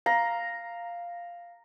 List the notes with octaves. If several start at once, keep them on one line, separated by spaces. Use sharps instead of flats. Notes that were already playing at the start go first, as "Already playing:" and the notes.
F5 A#5